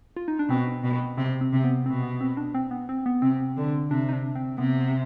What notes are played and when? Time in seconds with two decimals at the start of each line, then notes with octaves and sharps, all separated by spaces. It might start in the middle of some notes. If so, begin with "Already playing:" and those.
0.17 F4
0.28 D#4
0.39 D4
0.49 B2 C4
0.84 B2
1.18 C3 C4
1.41 C4
1.53 C3 C4
1.64 B3
1.86 B2 C4
2.03 B3
2.21 C4
2.37 D4
2.54 C4
2.71 B3
2.89 C4
3.06 B3
3.22 C3 C4
3.57 D3
3.90 C3 D4
4.09 D#4
4.13 D4
4.35 C4
4.58 C3 B3